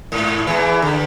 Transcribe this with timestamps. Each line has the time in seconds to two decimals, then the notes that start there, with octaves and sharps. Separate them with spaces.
0.12 G#2
0.47 E2 E3
0.82 D3